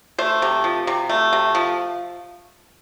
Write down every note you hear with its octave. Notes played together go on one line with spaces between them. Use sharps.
A3 C5
C3
F3
C3
A3
C3
F3